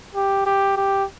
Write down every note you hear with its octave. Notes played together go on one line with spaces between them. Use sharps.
G4
G4
G4